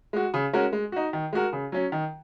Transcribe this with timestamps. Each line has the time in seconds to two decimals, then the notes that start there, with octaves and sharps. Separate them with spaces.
0.13 G#3 F#4
0.34 C#3
0.53 G#3 C#4 F#4 A#4
0.73 G#3
0.92 D#4 F#4
1.13 D#3
1.33 G#3 F#4 A#4
1.53 C#3
1.72 F#3 C#4
1.92 D#3